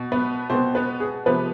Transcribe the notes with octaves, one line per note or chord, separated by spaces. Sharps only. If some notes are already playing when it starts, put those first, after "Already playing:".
Already playing: B2
B3 B4
B2 B3 C4 C5
B3 B4
G#4
C3 F3 B3 B4